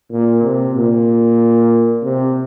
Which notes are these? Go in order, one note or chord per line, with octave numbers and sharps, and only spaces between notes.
A#2
C3
A#2
C3